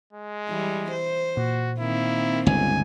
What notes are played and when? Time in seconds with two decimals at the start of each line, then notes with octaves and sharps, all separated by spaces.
0.13 G#3
0.49 E3 G3
0.91 C5
1.37 A#2 F#4
1.79 D#3 A#3 C4 E4
2.46 G1 C#2 G#5